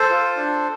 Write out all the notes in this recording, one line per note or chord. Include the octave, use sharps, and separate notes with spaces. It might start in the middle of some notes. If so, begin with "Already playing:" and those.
Already playing: A4 C5
F4
D4